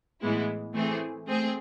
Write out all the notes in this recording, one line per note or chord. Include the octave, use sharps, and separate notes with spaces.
A2 E3 G#3 B3 E4
E3 A3 C4 G#4
A3 C4 G#4